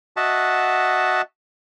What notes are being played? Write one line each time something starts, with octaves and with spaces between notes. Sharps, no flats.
F#4 D#5 E5 F#5 A5